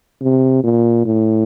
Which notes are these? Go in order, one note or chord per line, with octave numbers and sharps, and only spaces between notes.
C3
A#2
A2